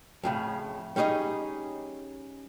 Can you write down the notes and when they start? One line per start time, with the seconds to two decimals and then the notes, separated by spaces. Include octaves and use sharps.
0.24 F2 A2 C#3
0.96 G3 C#4 D#4 G#4 D#5